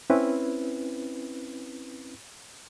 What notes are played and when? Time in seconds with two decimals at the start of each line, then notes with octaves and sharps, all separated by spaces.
0.10 C4 C#4 E4 B4